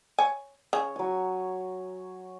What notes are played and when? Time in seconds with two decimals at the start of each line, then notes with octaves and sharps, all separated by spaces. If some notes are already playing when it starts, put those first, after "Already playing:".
0.19 C#5 G#5
0.73 C#3 G#4 C#5
0.96 F#3 G#5